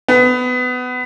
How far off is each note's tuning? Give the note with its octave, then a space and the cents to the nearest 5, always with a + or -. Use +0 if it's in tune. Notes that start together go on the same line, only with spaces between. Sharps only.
B3 +20